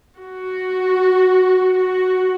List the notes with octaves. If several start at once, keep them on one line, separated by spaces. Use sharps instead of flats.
F#4
F#4